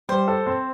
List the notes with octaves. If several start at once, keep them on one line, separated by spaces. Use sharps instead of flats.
G3 C5
A4
C4